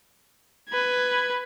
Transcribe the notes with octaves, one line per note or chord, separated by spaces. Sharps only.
B4 G#6